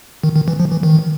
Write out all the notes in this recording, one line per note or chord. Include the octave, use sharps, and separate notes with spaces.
D#3
D#3
E3
F3
E3
D#3